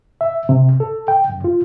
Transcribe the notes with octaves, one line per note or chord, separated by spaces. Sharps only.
E5
C3
A4
G5
F#2
F4